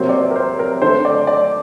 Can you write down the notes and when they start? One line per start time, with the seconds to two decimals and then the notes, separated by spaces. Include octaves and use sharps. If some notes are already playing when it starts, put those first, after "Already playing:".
Already playing: C3 F#3 A#3 C5
0.09 D5
0.13 C5
0.31 A#4
0.36 C5
0.59 A#4
0.82 D3 A3 C5
1.05 D5
1.27 D5